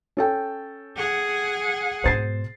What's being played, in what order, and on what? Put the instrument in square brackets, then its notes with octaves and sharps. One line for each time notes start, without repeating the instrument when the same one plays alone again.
[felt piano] C#4 A4 G5
[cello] G#4 F#5
[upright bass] G#2 B2 [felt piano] C5 A6 C7